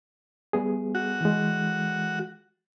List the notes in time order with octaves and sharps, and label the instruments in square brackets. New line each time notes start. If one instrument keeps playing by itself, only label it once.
[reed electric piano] G3 B3 G#4
[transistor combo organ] F#4
[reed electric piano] E3 G#3